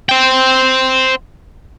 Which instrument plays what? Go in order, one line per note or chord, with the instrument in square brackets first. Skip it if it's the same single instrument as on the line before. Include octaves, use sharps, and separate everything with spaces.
[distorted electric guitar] C5 G5